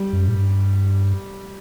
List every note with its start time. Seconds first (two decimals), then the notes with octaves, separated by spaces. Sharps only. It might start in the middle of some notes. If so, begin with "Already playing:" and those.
Already playing: G3
0.13 F#2
0.28 A2
0.35 G2